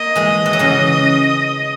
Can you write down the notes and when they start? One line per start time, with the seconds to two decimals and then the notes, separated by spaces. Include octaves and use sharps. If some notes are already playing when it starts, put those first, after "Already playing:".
Already playing: A#3 D#5
0.16 E3 G#3
0.46 E3
0.53 F#3
0.59 C#3 E3